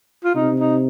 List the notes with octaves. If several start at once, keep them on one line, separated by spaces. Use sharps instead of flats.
F4
C3 D#4
D#4